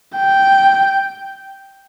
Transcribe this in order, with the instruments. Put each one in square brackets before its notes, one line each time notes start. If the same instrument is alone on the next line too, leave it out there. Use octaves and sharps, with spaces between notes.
[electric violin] G5